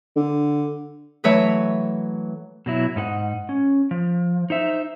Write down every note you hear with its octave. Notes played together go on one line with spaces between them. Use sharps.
D3
E3 F#3 A3 B4 C#5 E5
B2 F#3 E4
G#2 D#4 G4 F#5
C#4
F3
D#4 C5 E5